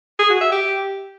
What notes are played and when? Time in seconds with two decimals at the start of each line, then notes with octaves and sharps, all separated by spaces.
0.19 G#4
0.30 F#4
0.41 E5
0.52 G4